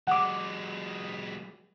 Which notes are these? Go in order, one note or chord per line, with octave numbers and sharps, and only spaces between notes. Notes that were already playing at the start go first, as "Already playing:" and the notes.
F#3 G#3 F#5 D6